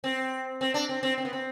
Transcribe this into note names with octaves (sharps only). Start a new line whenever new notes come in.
C4
C4
D4
C4
C4
C4
B3
C4